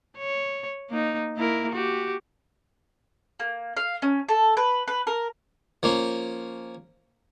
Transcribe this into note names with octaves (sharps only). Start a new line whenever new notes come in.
C#5
A#3 D#4
A#3 E4 A#4
F#4 G4
A#3
F5
C#4
A4
B4
B4
A#4
F3 A#3 C#4